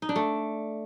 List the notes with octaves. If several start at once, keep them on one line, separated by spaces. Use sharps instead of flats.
D#4
D4
A3